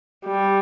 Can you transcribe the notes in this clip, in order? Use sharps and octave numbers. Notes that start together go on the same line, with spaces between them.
G3